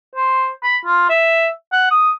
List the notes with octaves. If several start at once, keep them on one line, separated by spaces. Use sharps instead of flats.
C5
B5
F4
E5
F#5
D#6